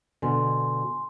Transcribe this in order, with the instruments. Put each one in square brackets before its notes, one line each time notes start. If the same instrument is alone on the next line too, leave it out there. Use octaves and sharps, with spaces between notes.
[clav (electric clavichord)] B2 D3 [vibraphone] G#5 C6